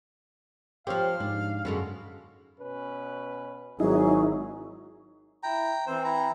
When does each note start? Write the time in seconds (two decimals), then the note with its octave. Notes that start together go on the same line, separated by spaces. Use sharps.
0.87 F3 C4 G4 C5 C#5 F5
1.20 G#2 D4
1.65 F#2 B2 D3 G#3
2.60 B2 C#4 B4
3.80 G#1 F#3 D#4 E4 G#4
5.43 E4 G5 A#5
5.87 E3 C4 C5
6.05 E4 A#5